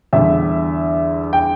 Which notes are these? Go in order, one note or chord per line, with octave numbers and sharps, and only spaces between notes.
E2 D3 G3 E5
G5